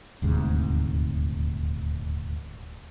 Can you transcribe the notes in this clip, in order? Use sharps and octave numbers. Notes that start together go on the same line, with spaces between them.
D#1 D2 G#2 C3